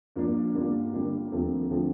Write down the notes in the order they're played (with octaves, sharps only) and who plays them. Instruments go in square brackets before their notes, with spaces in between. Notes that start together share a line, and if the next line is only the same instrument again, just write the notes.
[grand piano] G2 F3 A#3 D4
D3 G3 A#3 D4 F4
D3 G3 A#3 D4 F4
D#2 D3 F3 A3 C4
D3 F3 A3 C4